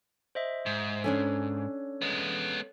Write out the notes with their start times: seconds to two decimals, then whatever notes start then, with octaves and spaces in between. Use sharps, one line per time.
0.35 C5 D#5 E5
0.66 G#2
1.04 C#4 D4 A4 C#5 G#5
2.02 G#3 B3